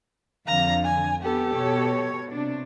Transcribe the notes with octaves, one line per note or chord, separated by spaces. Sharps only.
F2 D3 F5 A#5
G#5
B3 G4 A4
B2 C#5
C3 D4